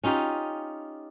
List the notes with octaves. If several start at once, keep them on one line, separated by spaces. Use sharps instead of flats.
C#4 D#4 F4 G4